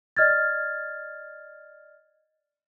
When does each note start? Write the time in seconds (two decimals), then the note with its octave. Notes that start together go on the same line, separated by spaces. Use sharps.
0.17 D5 D#5 F6 G#6 A6